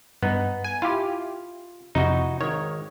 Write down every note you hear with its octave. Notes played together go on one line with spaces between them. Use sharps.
G2 B3 D#4
G#5
E4 F4 G4 F5
F2 C3 D#4 E4 F#4
G#1 D#3 C#5